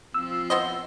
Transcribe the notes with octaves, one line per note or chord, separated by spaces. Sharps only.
F3 C4 F4 E6
B3 C5 D#5